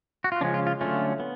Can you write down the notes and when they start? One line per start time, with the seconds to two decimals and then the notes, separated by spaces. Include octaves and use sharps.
0.24 F#4
0.32 F4
0.41 C#3 F3 G#3 C#4 D4
0.54 F4
0.67 F4
0.81 D3 F#3 A3 C#4 F4
1.20 B3